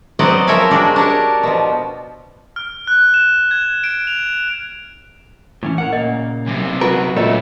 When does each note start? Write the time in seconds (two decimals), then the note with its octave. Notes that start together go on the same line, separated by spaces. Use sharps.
0.19 F#3 B3 C4 C5 D5 D#5
0.47 F3 A#4 C#5 E5 F5 G#5
0.71 G#3 D4 F#4 G4
0.96 D4 A#4 C#5
1.43 B2 F3
2.56 F6
2.87 F#6
3.14 E7
3.51 G#6
3.84 D7
4.07 F7
5.63 A2 E3 C#4
5.78 A2 A#4 F#5
5.93 A#2 C#3 A#3 D#5
6.47 B1 C3
6.81 F#4 A#4 B4
7.16 C#2 A#2 A3 F4 C#5 D#5 E5